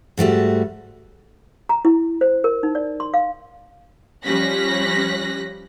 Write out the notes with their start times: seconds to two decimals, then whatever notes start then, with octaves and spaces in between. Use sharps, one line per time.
0.17 G#2 G3 A3 F#4
1.69 A#5
1.85 E4
2.21 C5
2.44 A#4
2.63 D#4
2.75 D5
3.00 C6
3.14 F5
4.23 F3 G3 C#4 F#6 A#6 B6